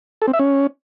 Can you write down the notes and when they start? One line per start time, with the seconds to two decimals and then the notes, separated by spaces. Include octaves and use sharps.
0.22 A4
0.28 C4
0.33 E5
0.39 C#4